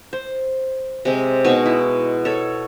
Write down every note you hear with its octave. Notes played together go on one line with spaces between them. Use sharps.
C5
C3 G#3 C4
B2 G#3 D#4 C#6
E4
A4 C#5